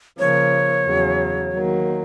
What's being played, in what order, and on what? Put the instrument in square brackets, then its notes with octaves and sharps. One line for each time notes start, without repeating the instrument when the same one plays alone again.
[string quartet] C#3 F3 A#3 [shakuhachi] C#5
[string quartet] E2 C#3 F#3
D#3 F#3 A#3